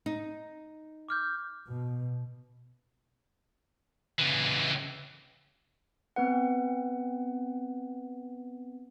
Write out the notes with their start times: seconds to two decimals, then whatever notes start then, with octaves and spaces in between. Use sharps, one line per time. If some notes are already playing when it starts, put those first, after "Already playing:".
0.06 D#4
1.09 D6 F6 G6
1.68 B2
4.19 C#2 E3
6.16 B3 C4 B4 F#5